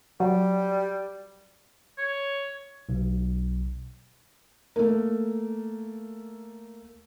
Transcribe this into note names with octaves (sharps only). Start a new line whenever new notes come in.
F#3 G3
C#5
B1
A3 A#3